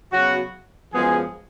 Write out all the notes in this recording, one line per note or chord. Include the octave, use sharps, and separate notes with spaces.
C#3 F#3 B3 F#4
F#2 F3 G#3 B3 G#4